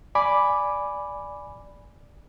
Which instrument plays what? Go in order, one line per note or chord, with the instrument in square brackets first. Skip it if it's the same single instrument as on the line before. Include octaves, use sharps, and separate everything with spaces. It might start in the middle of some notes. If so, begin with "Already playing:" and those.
[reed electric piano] D5 G#5 B5 D6